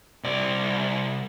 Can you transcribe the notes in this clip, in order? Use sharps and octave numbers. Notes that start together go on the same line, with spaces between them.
C2 D5